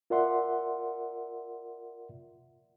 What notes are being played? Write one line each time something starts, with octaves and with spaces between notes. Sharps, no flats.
F4 A#4 D5 E5 F#5 C6